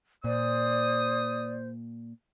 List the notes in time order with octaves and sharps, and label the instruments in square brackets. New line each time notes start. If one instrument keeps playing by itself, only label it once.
[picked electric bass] A#2 [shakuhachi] C5 [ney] D5 [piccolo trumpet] D#6